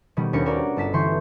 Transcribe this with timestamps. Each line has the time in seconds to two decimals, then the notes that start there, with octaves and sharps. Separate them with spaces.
0.17 B2 D#3 G3 B3
0.33 D#2 C#4 D4 A#4 C#7
0.45 F#4 A#4 C#5 D5
0.76 G1 A5 B6 E7
0.93 D3 E3 B4 C6 C#6 G6